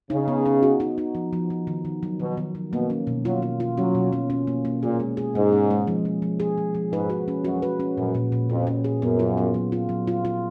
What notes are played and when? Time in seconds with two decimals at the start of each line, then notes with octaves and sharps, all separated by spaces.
0.10 C#3 D#4
0.28 B3
0.46 D#4
0.63 F#4
0.80 D#4
0.98 D#4
1.15 F3
1.33 F3
1.50 F3
1.67 D#3
1.85 D#3
2.03 F#3
2.20 B2 D#3
2.37 D#3
2.55 F#3
2.72 B2 A#3
2.90 C#4
3.07 B2
3.25 F#3 F4
3.42 F4
3.60 F4
3.78 F#3 C#4
3.95 B2
4.13 C#4
4.30 C#4
4.47 A#3
4.65 A#3
4.82 A#2 G#4
5.00 G#3
5.17 G#4
5.35 G#2 G#3
5.53 C#4
5.70 G#3
5.87 F3
6.05 F3
6.22 F3
6.40 G#4
6.58 F3
6.75 F3
6.92 G#2 B4
7.10 F#4
7.28 C#4
7.44 F#2 F#4
7.62 B4
7.80 C#4
7.97 F#2 A#2
8.15 A#2
8.32 A#2
8.50 F2 A#2
8.67 C#4
8.84 G#4
9.02 F#2 B3
9.19 F4
9.37 B3
9.54 F#3
9.72 F4
9.89 F#3
10.07 F4
10.25 F4